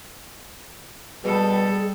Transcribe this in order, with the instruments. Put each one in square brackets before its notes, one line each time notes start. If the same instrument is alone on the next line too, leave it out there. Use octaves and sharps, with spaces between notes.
[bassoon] B2 [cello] G3 [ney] G#4 [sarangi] A4